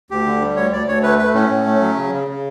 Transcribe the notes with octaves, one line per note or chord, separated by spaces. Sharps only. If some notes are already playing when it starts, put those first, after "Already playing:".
D2 G4
D3
G3
D2 C#5
D2 D5
D2 C#5
A3 B4
A3 B4
A2 C#4
A2
A3
F#3
C#3
C#3
C#3